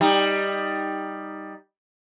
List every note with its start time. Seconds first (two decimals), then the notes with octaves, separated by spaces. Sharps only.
0.01 G3 D#4